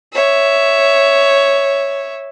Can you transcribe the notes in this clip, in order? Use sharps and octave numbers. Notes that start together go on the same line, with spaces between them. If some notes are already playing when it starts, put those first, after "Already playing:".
C#5 E5